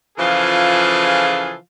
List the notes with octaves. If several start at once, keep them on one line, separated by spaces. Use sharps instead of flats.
C#3 E3 F3 F4 G#4 A4